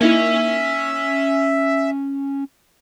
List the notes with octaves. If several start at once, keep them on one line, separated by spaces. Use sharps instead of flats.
A#3 C#4 D#4 E4 E5 G#5